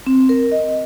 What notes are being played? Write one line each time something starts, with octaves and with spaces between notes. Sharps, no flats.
C4
A#4
D#5